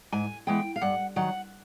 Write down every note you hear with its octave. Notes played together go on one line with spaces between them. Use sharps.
G#2 G#5
E3 G#3 B3 G5
F5
G2 F#5
D#3 F#3 F#5